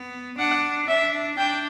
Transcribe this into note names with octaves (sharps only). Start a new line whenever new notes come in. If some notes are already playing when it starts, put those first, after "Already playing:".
Already playing: B3
D4 F#5
D4 E5
D4 G5